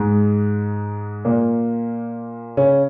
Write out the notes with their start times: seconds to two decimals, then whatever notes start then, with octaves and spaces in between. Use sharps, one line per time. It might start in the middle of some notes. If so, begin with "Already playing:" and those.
Already playing: G#2 G#3
1.25 A#2 A#3
2.57 C#3 C#4